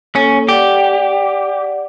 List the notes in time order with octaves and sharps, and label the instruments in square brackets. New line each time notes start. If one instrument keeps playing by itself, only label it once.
[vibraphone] A#3 A4 C#5 [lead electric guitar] C#4
[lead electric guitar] G4 [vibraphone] D5 F#5